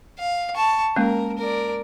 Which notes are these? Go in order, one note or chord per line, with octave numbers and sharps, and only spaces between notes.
F5
A5 C#6
G#3 A#3 C#4 A#4
A#4 D5